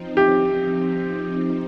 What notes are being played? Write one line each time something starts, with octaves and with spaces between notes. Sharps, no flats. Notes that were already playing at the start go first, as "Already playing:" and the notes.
Already playing: F3 C4 D#4
G4